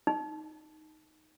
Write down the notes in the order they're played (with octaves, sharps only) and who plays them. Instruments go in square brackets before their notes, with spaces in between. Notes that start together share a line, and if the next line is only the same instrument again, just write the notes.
[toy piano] D#4